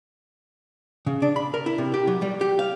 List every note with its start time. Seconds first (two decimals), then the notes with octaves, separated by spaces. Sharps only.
1.06 C#3
1.22 D4
1.36 B5
1.54 A#4
1.66 E4
1.78 C3
1.94 G4
2.07 F#3
2.22 G3
2.41 G4
2.59 F5